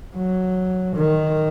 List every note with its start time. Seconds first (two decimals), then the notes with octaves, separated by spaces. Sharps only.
0.16 F#3
0.96 D#3